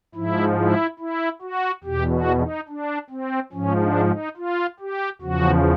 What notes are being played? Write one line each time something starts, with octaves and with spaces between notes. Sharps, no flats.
G#2 F3 E4
E4
E4
F#4
E2 B2 G4
F#4
D#4
D4
C4
G#2 F3 C#4
D4
D#4
F4
G4
E2 C#3 F3 F#4